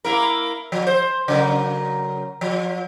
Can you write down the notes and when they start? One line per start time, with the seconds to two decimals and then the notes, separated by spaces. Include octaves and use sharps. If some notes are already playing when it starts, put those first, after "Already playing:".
0.05 A#3 E4 A#4
0.72 F3
0.87 C5
1.28 C#3 F#3 A#4
2.41 F3